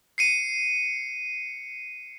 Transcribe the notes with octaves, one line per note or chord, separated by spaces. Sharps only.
C7 C#7 D#7